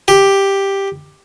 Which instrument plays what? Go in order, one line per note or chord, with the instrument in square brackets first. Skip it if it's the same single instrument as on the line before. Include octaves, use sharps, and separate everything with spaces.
[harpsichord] G4